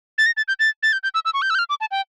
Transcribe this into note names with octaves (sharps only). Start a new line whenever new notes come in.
A6
A#6
A6
G6
A6
A6
G6
G6
E6
E6
C#6
G6
E6
G6
F6
D6
A5
G5